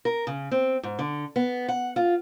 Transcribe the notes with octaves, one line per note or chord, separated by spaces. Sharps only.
A#4
C#3
C4
G#2
D3
B3
F#5
F4